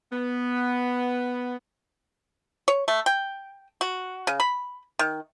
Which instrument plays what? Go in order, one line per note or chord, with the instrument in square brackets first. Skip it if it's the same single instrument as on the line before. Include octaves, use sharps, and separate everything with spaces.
[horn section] B3
[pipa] C#5
A3
G5
F#4
C#3
B5
D#3